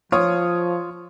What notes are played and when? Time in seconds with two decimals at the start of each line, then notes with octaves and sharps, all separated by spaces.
0.12 F3 F4 C#5 D#6